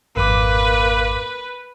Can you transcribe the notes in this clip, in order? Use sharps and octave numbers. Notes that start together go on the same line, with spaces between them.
G#1 F2 A#3 B4 D6